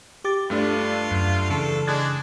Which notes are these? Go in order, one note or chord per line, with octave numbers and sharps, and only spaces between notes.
G4 D6 A6
G2 A3 D4 F4
F#2
C#3 E3 A4
G#3 D4 F#6 G#6 A6